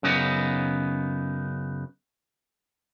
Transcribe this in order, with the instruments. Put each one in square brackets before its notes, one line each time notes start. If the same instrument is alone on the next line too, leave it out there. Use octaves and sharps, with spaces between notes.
[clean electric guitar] F#2 C#3 B3 D#4